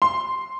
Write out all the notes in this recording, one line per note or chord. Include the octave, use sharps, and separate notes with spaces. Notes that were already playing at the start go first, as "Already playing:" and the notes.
C6